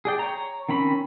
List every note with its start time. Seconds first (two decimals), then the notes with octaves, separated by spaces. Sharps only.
0.05 G#4 D5 G5
0.19 C#5 A#5
0.69 D#3 C4 C#4 B5